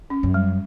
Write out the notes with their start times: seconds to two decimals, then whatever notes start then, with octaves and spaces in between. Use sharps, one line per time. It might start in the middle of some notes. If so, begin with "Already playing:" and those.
0.10 C#4
0.23 F#2
0.34 G3